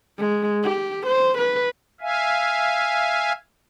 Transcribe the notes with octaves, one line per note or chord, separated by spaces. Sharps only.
G#3
G4
C5
B4
E5 F5 G#5